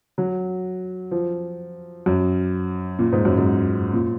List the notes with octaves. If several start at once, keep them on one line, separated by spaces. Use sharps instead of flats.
F#3
F3
F#2
A#2
G#2
F#2
G#2
A#2